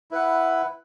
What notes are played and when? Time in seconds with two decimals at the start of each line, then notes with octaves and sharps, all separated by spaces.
0.11 E4 B4 F#5